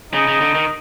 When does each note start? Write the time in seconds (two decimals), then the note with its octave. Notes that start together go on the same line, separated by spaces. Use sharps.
0.13 C#3 D#4
0.27 C#3
0.41 D3
0.55 D#3